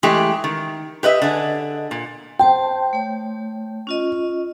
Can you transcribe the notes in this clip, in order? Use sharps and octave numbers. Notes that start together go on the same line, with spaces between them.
E3 G#3 A3 G4
D#3
G4 B4 D#5 E5
D3 G#4
A#2
C5 G5 A5 C6
A3 C#5
C#4 F4 D#5